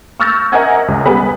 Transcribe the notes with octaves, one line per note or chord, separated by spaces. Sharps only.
C#6 E6 F6 G6 A6 A#6
A#4 D#5 E5 F#5 G#5 G#6
C#2
G3 B3 G#4 B4